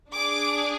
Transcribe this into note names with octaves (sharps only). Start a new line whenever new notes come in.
D4 G#4 D6